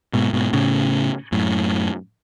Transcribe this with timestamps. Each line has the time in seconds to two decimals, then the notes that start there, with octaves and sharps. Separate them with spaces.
0.13 G#2 B2
0.33 G#2 B2
0.53 A2 C#3
1.32 F#2 A2